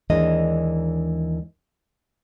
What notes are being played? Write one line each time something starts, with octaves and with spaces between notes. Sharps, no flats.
D#2 E3 G#3 D4 A#4 D#5